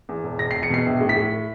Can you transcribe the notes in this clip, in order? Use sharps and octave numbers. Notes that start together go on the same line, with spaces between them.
E2
E1
E1 A#6
E1 C7
C#7
B2 C7
A#1
A2
B6
A2